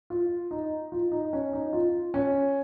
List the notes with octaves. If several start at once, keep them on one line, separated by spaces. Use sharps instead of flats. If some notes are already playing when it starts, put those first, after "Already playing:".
F4
D#4
F4
D#4
C#4
D#4
F4
C#4